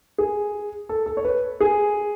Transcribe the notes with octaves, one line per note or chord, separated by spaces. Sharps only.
G#4
A4
A4
C#5
B4
G#4